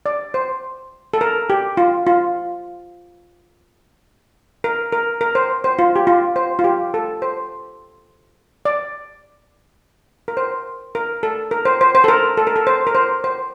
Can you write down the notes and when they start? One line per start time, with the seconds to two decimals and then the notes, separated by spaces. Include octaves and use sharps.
0.06 D5
0.34 C5
1.14 A4
1.21 A#4
1.50 G4
1.77 F4
2.07 F4
4.64 A#4
4.93 A#4
5.21 A#4
5.35 C5
5.64 C5
5.79 F4
5.96 G4
6.07 F4
6.36 C5
6.59 F4
6.64 G4
6.94 A4
7.22 C5
8.65 D5
10.28 A#4
10.37 C5
10.95 A#4
11.23 A4
11.51 A#4
11.65 C5
11.81 C5
11.95 C5
12.04 A4
12.08 A#4
12.37 A4
12.47 A#4
12.56 A4
12.67 C5
12.87 A#4
12.95 C5
13.24 C5